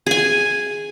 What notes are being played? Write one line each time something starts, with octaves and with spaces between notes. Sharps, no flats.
G#4 G#5